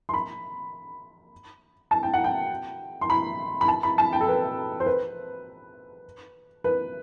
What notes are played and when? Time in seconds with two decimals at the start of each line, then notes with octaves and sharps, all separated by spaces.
0.09 C6
0.14 B5
1.91 A5
2.03 G5
2.13 F#5
2.24 G5
3.01 C6
3.10 B5
3.61 B5
3.68 A5
3.83 B5
3.98 A5
4.13 G5
4.21 A4
4.28 B4
4.80 C5
4.86 B4
6.64 B4